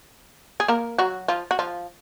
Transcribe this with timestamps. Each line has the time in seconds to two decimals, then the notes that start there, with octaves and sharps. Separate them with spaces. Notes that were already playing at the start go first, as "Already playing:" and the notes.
0.60 G#4
0.68 A#3 A#4
0.98 F#3 F#4
1.28 F3 F4
1.51 F#4
1.59 F3 F4